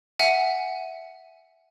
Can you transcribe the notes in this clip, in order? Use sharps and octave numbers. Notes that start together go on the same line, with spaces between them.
E5 F#5 G#5